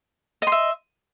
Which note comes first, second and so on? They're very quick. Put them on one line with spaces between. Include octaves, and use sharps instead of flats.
D#5 C6 E5